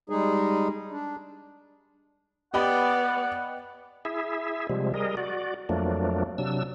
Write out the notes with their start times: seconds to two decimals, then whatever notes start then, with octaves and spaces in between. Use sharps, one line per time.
0.10 G3 G#3 D#4 G#4
0.92 D4
2.54 B3 G4 D5 D#5 F#5 G5 B5
4.05 E4 G#4 E5
4.69 C3 F3 G3 G#3
4.94 G3 G#4 A#4 D#5
5.17 F#4 D5
5.69 F2 F3 F#3 A3 A#3 D4
6.38 C3 F#3 D4 E6